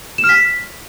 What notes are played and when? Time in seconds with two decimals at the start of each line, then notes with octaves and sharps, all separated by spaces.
0.18 E7
0.24 F6
0.29 B6